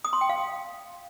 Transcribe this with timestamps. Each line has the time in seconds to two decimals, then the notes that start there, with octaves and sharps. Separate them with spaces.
0.05 D#6
0.13 C6
0.21 G5
0.29 F5